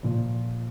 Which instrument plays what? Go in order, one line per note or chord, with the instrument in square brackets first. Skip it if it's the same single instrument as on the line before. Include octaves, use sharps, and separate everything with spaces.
[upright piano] A#2 F3 F4